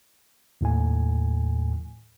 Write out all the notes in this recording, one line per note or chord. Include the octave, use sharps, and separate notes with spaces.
D#2 A2 A3 G#5